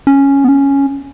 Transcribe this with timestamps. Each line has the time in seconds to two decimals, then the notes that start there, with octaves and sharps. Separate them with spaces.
0.07 C#4
0.44 B3
0.49 C#4